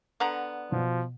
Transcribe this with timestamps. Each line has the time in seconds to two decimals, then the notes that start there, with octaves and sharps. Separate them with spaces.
0.20 D3 B3 A#5
0.72 B2 F3